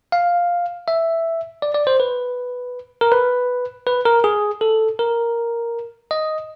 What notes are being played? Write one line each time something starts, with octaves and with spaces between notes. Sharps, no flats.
F5
E5
D5
D5
C5
B4
A#4
B4
B4
A#4
G#4
A4
A#4
D#5